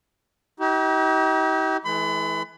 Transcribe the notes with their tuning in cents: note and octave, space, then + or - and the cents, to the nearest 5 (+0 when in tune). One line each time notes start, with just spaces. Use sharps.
D#4 +40 G4 -35
E3 -15 G#3 +45 B5 +35